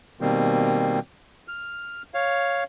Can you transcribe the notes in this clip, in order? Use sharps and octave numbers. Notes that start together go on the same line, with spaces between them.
B2 D#3 G3 A#3 C4
F6
C#5 F5